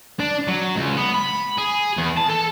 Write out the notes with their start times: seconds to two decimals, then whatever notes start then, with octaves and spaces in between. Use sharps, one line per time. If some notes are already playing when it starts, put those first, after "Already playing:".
0.20 D4
0.47 F#3
0.75 C#2
0.97 B3
1.14 B5
1.58 G#4
1.97 E2
2.17 A5
2.29 A4